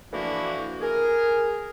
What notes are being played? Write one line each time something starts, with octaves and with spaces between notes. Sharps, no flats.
D3 E3 F3 A#3 E4 F#4
G#4 A#4